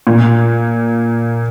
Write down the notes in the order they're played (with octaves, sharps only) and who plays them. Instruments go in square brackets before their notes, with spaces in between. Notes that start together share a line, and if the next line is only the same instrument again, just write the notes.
[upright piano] A#2